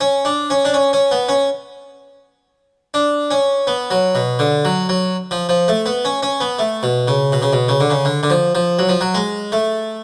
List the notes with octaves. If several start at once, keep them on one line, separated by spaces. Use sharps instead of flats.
C#4
D4
C#4
D4
C#4
C#4
B3
C#4
D4
C#4
B3
F#3
B2
D3
F#3
F#3
F3
F3
A3
B3
C#4
C#4
B3
A3
B2
C#3
B2
C#3
B2
C#3
D3
C#3
D3
D3
F3
F3
F#3
F3
F#3
G#3
A3